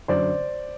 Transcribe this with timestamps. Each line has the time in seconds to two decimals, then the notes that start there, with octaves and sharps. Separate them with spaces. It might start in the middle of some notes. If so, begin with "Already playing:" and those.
0.08 F#2 D3 F#3 C5 D5